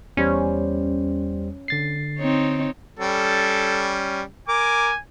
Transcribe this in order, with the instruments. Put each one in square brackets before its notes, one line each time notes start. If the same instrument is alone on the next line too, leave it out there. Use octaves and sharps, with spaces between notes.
[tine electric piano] E2 G3 C5 [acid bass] C#4
[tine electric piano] D3 A6 C7
[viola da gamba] C4 D#4 C#5
[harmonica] G3 C#4 [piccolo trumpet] A4
[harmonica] A#4 D6 [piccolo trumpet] G#5